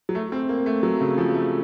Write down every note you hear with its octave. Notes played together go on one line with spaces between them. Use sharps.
F#3
A3
C4
A#3
A3
F#3
C#3
F3
A3